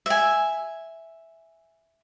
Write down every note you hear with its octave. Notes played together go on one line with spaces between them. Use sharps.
E5 G#5